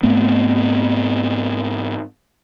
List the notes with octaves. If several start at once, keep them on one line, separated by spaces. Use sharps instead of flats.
G#2 A3 B3 C4